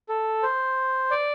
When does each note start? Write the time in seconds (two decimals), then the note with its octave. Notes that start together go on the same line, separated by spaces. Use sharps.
0.09 A4
0.43 C5
1.11 D5